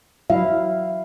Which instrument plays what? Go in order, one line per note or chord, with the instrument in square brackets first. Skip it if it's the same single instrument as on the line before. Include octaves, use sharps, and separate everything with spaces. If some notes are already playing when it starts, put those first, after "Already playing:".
[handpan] F#3 E4 F5 [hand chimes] E5